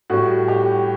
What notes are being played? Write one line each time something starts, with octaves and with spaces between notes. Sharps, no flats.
A2 G3 F#4
G4